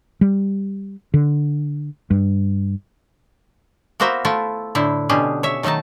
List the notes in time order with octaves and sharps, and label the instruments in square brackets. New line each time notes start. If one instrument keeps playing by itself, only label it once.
[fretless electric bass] G3
D3
G2
[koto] A#3 B3 F#4 A#4 C5 E5
A3 E4 F4 A4
A2 D3 E4 C5
B2 D3 C#4 G4 G#4
C#5 E5
D#3 F#3 A3 D#4 A5